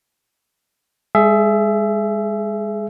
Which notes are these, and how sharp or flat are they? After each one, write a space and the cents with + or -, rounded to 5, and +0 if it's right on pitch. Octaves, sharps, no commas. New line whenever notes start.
G#3 -30 G#4 +30 E5 +20